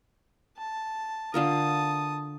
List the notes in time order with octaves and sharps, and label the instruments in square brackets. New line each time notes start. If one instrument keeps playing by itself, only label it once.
[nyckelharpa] A5
[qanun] D3 F4 A#4 [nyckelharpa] A5 D#6